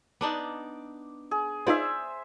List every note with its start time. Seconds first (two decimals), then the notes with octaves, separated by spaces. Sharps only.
0.21 B3 D4 D#4 D6
1.31 G#4
1.67 D#4 F4 G#4 B4 C5 D5 E5